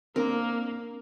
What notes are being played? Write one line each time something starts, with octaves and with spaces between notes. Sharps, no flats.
A#3 C4 D4 A#4